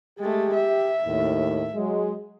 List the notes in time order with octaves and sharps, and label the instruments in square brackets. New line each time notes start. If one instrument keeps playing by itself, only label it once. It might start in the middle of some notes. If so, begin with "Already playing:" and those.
[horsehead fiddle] G#3 A3 [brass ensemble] G4
[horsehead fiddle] E5
[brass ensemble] D#2 A2
F#3 G#3